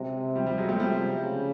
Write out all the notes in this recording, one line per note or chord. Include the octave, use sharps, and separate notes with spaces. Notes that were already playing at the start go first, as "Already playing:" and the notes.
Already playing: C3 F#3 G#3
F3 G3
F3 G3
F#3 G#3
G3 A3
C3 F3 G3
C#3